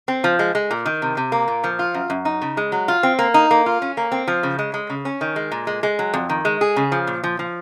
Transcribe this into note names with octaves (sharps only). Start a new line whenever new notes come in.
C4
F3
G#3
G#3
A#2
D#3
C3
C3
A#3
A#2
F3
F4
F#2
F#2
D#4
C#3
G#3
F#3
F4
C4
A#3
D#4
A#3
F4
C#4
A#3
C4
F3
C#3
G#3
G#3
C#3
C#4
D#3
G#3
A#2
G#3
G#3
F#3
F2
D#3
G#3
G#4
C#3
F3
A#2
F3
F3